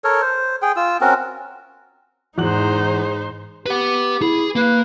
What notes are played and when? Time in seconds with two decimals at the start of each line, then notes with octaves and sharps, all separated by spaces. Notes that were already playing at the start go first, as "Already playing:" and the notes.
0.04 A4 A#4 C#5
0.22 C5
0.62 G#4 G5
0.76 F4 E6
1.01 C4 C#4 F#4 A#4
2.38 E2 G#2 D#4 G#4 C5 F#6 F#7
3.66 G4 B4 F#5
4.22 E4 G#4
4.56 A#3 B4